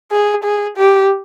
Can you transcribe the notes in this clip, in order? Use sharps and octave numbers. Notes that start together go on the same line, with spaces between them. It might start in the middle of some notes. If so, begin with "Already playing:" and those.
G#4
G#4
G4